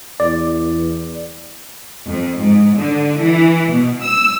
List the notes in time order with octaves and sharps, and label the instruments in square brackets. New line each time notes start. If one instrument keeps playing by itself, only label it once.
[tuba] E2 [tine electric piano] D5
[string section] F2
G#2
D3
E3
B2
E6